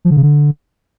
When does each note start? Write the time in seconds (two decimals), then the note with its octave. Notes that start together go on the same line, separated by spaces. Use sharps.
0.05 F3
0.11 D3
0.17 C#3
0.23 D3